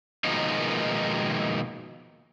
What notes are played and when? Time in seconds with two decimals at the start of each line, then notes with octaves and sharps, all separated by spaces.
0.24 B2 D#3 F3 G#3 A#3 D#4